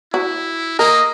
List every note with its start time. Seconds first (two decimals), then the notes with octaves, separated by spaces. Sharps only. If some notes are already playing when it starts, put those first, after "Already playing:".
0.14 E4 F#4
0.79 A#3 A#4 D#5